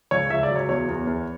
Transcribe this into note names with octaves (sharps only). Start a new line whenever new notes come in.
C#2 C#5
C#2 E5
D5
F#3
C#5
E2 C#5
E2
E2